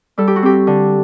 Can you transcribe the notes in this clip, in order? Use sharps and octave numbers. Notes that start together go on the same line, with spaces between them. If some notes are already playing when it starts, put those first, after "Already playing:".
G3 A4
G4
F#4
C4 G4
D3